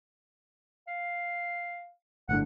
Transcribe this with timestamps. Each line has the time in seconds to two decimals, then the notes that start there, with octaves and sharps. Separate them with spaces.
0.88 F5
2.29 G1 A2 D3 F#5